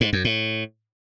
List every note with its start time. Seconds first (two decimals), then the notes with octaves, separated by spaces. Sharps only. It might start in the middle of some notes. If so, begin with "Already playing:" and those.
0.01 G#2
0.13 F#2
0.25 A2